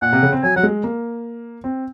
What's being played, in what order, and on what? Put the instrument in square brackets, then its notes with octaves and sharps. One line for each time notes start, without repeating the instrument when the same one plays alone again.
[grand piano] A#2 [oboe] F#5
[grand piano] C3
C#3
C4
[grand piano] F#3 [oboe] G#5
[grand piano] F#3 [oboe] F#5
[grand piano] G#3
A#3
C4